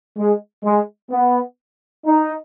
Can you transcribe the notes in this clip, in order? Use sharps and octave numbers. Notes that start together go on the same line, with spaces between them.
G#3
G#3
B3
D#4